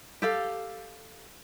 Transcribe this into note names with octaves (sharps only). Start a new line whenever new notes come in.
G4 A4 F5